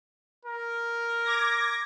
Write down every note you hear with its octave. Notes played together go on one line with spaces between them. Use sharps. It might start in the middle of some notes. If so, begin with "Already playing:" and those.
A#4
D6 G#6 A#6